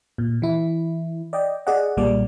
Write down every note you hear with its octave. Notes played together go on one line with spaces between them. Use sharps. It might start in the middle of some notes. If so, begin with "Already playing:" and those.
A#2
E3 E4
D5 D#5 G5
G#4 D5 D#5 F#5
B1 A#2 G3 A#3 D5